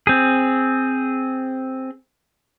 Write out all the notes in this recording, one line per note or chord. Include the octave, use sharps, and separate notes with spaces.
C4 G#4